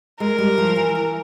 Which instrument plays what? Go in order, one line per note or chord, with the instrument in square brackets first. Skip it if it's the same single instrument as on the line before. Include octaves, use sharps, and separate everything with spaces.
[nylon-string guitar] G#3 [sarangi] A#4
[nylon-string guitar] G3
F3
E3
E3